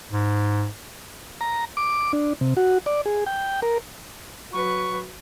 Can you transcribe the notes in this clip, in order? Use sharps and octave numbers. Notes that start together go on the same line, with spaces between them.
G#2
A#5
D6
D4
C3
F#4
D5
G#4
G5
A#4
F#3 B4 C#6